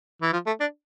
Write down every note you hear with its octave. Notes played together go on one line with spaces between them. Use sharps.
E3
F3
A3
D4